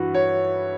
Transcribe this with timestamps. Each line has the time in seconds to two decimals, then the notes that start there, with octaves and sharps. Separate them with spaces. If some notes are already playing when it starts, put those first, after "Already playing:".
Already playing: G2 E3 E4 F#4
0.14 C#5